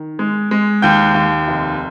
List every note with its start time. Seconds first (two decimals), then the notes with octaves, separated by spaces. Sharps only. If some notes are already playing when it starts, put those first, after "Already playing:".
Already playing: D#3
0.19 G#3
0.51 G#3
0.82 D#2 G5 G6
1.14 D#2
1.48 F1